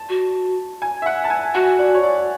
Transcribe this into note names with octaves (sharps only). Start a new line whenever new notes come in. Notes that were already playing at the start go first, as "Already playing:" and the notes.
Already playing: A5
F#4
G#5
E5
F#5
A5
G#5
F#4 F#5
D5
C#5
D5